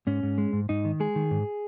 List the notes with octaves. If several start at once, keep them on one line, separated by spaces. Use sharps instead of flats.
G#2 C#4
G#2
G#3
G#2
G#2 D#4
D#3
G#3 G#4
D#3
G#2